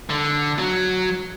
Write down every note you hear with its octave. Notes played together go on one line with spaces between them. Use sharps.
D3
F#3